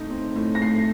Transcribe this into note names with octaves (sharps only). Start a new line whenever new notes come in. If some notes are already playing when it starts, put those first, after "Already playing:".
Already playing: A2 A3 C4 D#4
C4
A2
A#6
A3 C7